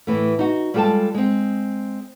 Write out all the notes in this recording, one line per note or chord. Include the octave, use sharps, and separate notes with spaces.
A2 E3 A3
D#4 F#4
G3 G#3 F4 A4 G5 A5
G#3 C4